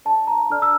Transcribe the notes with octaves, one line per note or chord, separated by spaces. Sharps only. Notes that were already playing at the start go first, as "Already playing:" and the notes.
D4 A4 D5 A5
A#5
D4 A4 D5 F6
E6